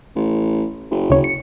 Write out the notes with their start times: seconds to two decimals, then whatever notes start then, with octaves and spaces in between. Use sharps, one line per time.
0.15 A1
0.91 F#1
1.10 D2 C#3 C#5
1.24 C#7